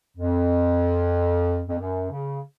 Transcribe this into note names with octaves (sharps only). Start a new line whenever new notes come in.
F2
F2
F#2
C#3